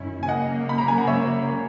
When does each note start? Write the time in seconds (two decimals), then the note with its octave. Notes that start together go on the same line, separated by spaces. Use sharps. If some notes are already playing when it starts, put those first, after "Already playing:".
Already playing: F#2 D#3 C#4 E4
0.23 G#5
0.28 C#3 F#3 A#3 D#5 F#5
0.69 B5
0.78 A#5
0.88 G#5
0.98 F#5
1.07 C#5 E5